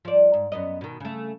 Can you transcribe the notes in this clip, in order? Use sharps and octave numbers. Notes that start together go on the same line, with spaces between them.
F3 D5
G#2
F#2 B3 D#5
B2 D#3
C#3 A3